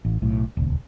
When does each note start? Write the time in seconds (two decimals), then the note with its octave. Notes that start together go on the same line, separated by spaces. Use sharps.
0.05 A1
0.22 B1 A2
0.57 D#1 C#2